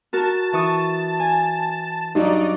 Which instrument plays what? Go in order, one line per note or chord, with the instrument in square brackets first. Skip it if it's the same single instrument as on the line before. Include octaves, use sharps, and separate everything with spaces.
[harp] F#4 A#4 [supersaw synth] A5
[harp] E3 C#6 D#6
G#5
[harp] G2 F#3 [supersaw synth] D#4 D5